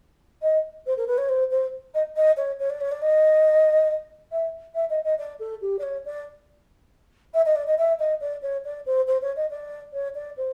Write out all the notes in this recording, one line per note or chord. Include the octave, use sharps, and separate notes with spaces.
D#5
C5
A#4
B4
C#5
C5
C5
D#5
D#5
C#5
C#5
D5
C#5
D5
D#5
E5
E5
D#5
D#5
D5
A4
G4
D5
C#5
D5
E5
D#5
D5
D#5
E5
D#5
D5
C#5
D5
C5
C5
C#5
D#5
D5
C#5
D5
C5